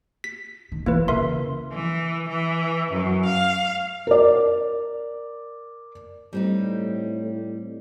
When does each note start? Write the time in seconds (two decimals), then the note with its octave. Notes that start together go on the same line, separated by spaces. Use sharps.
0.24 B6
0.72 D#3
0.86 E3 A#3 E4 B4
1.08 C#3 A#4 E5 C6
1.72 E3
2.29 E3
2.92 F#2
3.26 F5
4.07 A#4 D5
6.33 A2 G3 C4 D#4